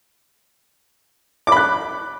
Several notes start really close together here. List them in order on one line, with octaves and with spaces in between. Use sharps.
D6 B5 F#6